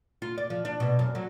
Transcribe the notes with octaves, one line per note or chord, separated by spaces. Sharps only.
F4
D5
F3
D4
B2
F#2
F#3